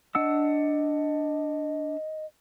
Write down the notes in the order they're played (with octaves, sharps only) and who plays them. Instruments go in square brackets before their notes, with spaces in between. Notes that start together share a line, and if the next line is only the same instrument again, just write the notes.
[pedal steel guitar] D4 F#5 E6 [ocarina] D#5